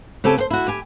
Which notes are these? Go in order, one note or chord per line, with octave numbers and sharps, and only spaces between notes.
C#3 C4 G4 A4 G#5
B3 C5
E4 F#4
G4 G#5